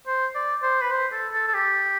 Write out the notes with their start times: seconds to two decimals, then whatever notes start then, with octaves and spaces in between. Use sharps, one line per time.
0.07 C5
0.35 D5
0.63 C5
0.81 B4
0.91 C5
1.13 A4
1.33 A4
1.47 A4
1.54 G4